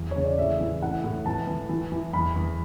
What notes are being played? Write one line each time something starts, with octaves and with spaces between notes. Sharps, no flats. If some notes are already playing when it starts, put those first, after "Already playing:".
Already playing: E2
C#3 C#5
D5
A2 E5
E3
A2 F#5
A2
E3 A5
E3
E3
E3
E2 B5
E2